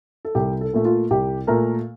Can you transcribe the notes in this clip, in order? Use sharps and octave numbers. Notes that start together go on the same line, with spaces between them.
A4
C2 G4
A4
A#2 A3
F4
C2 G4
A#2 A3 A#4